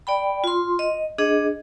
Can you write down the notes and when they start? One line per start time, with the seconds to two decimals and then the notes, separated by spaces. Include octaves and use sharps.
0.07 D5 G5 B5
0.44 F4 C6
0.79 D#5
1.18 D4 G#4 D#5